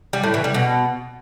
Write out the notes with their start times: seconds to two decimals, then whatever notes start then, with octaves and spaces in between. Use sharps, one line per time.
0.13 G3
0.24 A2
0.34 E3
0.44 G3
0.54 B2